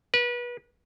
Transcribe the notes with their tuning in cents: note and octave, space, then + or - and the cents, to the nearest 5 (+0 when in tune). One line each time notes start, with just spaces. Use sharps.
B4 -30